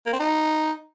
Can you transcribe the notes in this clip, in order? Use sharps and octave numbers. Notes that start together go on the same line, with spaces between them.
A#3
C4
D#4